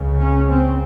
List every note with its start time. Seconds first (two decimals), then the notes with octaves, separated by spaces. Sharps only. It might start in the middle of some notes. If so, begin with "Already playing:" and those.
Already playing: C#2 C#3
0.19 C#4
0.49 C4